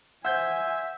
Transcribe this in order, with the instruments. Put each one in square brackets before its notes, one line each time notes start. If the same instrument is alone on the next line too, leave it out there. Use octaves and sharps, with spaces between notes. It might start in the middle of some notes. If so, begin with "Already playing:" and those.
[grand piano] C5 G6 [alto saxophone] E5 [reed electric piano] F#5 [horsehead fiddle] G#5